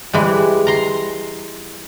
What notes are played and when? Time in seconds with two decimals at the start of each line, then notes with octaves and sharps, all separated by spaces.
0.13 E3 G3 G#3
0.67 A#5 C6